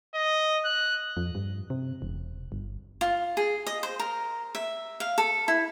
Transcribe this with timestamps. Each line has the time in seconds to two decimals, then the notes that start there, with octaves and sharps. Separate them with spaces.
0.15 D#5
0.65 F#6
1.17 F2
1.35 G2
1.70 C3
2.02 E1
2.52 G1
3.01 F4
3.37 G#4
3.67 D#5
3.83 C5
3.99 A#4
4.55 E5
5.00 F5
5.18 A4
5.48 E4